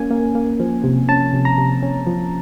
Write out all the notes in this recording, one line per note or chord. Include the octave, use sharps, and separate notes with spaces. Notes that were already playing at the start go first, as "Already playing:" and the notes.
Already playing: A#3 C#4 G#5
A#3
A#3
F3
C3
C#4 A5
C3
A#5
C3
C#4
F3